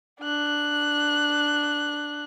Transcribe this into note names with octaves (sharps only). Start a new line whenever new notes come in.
D4 F#6